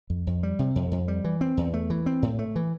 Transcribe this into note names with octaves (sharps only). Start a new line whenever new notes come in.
F2
F2
G3
C3
F2
F2
G3
E3
C4
E2
A3
E3
C4
A2
A3
E3